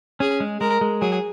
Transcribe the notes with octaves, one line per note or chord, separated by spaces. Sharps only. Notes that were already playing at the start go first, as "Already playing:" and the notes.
C#4 G#4
G#3
G#3 A#4
G#3
F#3 G#4